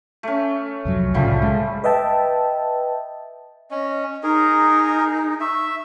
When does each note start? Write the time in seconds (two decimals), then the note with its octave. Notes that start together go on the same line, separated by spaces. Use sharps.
0.23 A3 C#4
0.85 C2 F2 F#3
1.14 C2 A2 C#3 F3 G3 A3
1.42 G#3
1.84 B4 D#5 E5 G5 A5
3.71 C#4 D#5
4.23 D#4 G#4 A#4
5.40 E5 C#6